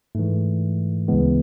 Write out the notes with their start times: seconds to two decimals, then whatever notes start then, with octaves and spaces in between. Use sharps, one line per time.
0.15 G#2 E3 A3
1.08 D2 C#3 E3 G#3 B3